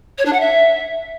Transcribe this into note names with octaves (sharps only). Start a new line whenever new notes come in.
C#5
D4
F#5
E5